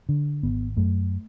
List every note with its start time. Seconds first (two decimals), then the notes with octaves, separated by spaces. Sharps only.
0.09 D3
0.43 G#1 B3
0.77 F#2 A3